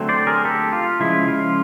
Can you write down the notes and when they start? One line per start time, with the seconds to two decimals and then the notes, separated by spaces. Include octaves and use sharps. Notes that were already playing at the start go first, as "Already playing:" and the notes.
Already playing: D3 F#3 A3 C4
0.09 C5 D5
0.27 G#4 A#4
0.45 G4 A4
0.73 F4
1.00 C#3 F3 G#3 E4
1.28 F4